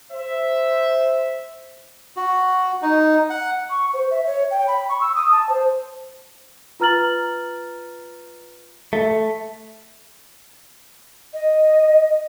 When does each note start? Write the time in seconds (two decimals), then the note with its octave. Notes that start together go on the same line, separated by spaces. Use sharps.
0.11 C5 E5
2.16 F#4
2.82 D#4
3.30 F#5
3.70 C#6
3.94 C5
4.11 E5
4.27 C#5
4.51 G5
4.67 B5
4.89 C#6
5.01 E6
5.15 D#6
5.32 A5
5.49 C5
6.80 F4 B4 A#5 F6 A6 F#7
8.93 A3
11.33 D#5